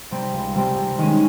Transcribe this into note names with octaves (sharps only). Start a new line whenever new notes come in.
C3 G3 C4
C#2
C3 G3 C4
C3
D#3 G#3 C#4